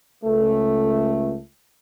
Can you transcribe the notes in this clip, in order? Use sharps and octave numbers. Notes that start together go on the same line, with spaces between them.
C#2 A3